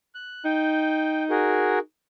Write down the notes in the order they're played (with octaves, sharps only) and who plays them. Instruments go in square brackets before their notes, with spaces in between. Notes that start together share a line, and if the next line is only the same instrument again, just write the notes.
[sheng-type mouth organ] F#6
[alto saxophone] D#4 [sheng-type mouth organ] G5
[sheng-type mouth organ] F#4 G#4 A#4